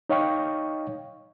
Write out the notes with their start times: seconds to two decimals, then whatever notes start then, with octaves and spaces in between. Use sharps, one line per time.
0.09 D#4 C#5 D#5 F5 G5 C#6